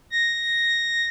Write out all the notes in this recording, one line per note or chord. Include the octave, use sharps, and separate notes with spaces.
A#6